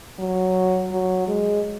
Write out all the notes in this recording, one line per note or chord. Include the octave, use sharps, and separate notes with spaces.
F#3
F#3
G#3